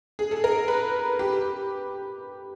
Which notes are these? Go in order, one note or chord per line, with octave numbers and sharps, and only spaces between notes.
G#4
A4
A#4
B4
G4